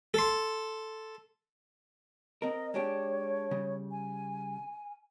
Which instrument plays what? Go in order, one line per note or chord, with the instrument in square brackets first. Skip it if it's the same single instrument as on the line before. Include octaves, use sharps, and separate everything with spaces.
[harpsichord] A4 C6
[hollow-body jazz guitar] C4 A#4 [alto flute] D#5
[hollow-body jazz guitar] G#3 D4 G4 [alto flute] C#5
[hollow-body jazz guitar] C#3 G3
[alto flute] G#5